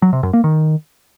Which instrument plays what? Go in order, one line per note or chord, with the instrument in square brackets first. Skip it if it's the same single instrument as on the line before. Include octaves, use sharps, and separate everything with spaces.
[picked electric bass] F#3
C3
F#2
A#3
D#3